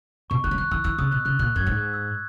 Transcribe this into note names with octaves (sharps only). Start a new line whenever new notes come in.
B2 C#6
D#3 F#6
F#3
E3 F#6
E3 E6
E3 E6
C#3 D#6
B2 F#6
C#3 F#6
A#2 F#6
F#2 G#6
G#2
F#6
E6